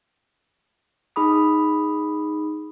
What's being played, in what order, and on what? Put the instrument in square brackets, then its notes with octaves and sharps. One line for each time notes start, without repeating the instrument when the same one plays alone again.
[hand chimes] D#4 G#4 B5 D#6